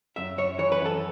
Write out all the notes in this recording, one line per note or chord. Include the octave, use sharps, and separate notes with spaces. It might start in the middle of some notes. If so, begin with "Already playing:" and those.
F#2 E5
F#2 C#5
E3 C#5
B4
F#2
A4